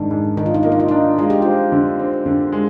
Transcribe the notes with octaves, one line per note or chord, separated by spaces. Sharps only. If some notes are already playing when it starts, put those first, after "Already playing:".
Already playing: G#2 D#3 D4
G#2
D#3 D#4
F4
D#4
A#3 F4
D#4
F4
D4 D#4
G#3 F4
G4
C4 F4
D3
C4
D3
G#3